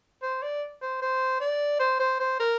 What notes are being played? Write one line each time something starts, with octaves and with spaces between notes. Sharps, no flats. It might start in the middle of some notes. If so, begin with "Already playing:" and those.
C5
D5
C5
C5
D5
C5
C5
C5
A#4